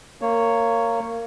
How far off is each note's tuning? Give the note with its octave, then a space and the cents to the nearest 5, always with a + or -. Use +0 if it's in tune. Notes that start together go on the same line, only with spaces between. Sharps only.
A#3 -15 C#5 +0